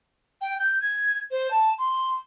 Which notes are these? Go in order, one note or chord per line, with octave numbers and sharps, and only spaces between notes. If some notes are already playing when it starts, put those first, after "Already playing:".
G5
G6
G#6
C5
A5
C6